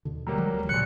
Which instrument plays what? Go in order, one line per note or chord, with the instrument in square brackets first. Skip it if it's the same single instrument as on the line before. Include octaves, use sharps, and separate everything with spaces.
[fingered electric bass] D#2 B2 D3
[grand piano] F#3 G3 A#3
[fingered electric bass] D3 F3 G#3
D2
[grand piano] A#1 F#6 [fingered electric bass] A#2 C#3 F3 [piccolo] C#7